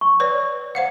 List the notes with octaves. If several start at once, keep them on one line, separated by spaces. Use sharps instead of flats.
C#6
B4 C#5 D5
C5 F5 F#5